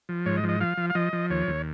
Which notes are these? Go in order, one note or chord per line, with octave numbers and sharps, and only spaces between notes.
F3
G#2 C#5
D#5
F3
D#5
F3 F5
F3
F5
F3 D#5
F3
D#2 C#5
D#2